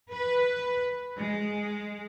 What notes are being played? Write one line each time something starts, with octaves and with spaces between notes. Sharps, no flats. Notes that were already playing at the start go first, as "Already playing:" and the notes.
B4
G#3